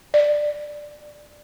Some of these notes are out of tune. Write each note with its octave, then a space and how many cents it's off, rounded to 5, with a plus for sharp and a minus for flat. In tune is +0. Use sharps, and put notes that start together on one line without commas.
D5 +10